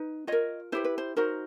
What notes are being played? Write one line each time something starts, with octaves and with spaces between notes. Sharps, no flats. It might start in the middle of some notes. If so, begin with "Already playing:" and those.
Already playing: D#4 B4
F4 A#4 C#5 D#5
E4 G4 B4 C5
B4
C5
D#4 F#4 A#4 C5